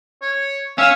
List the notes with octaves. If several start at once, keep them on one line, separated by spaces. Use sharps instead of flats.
C#5
C#4 E5 F5 E6